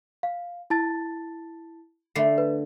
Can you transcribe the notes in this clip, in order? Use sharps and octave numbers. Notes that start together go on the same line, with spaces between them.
F5
E4 A5 A6
D3 A3 C7
B4